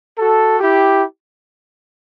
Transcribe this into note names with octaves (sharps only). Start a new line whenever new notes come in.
F#4 A4
E4 G4